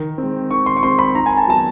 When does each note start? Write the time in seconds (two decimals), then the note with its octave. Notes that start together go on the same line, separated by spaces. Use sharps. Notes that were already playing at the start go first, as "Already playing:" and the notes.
Already playing: D#3
0.18 C4
0.23 G#3
0.50 D#3 C#6
0.66 C6
0.77 C#6
0.83 G#3 C4 C6
0.99 B5
1.15 D#3 A#5
1.26 G#5
1.37 A5
1.48 F#3 B3 A5